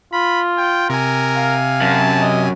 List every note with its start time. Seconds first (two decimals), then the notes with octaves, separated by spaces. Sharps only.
0.13 F4 B5
0.58 G5
0.90 C3 A#4 G#5
1.36 F5
1.81 F#2 A5
2.21 D#5